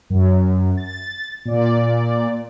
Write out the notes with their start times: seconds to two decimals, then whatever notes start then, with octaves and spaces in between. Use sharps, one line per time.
0.10 F#2
0.77 A6
1.45 A#2 D5